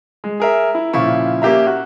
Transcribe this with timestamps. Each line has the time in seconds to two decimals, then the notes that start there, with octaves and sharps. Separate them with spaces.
0.24 G#3
0.40 G#4 A#4 E5
0.75 E4
0.93 A#2 C#3 F3 E4 C#6
1.42 A#3 C#4 G4 E5 A#5
1.67 F#4